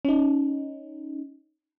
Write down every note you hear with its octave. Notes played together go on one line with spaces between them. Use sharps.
C#4 D#4